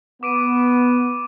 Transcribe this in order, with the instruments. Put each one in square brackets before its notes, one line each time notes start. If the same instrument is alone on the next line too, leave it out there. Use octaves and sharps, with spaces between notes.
[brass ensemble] B3 [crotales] D6 D7 D#7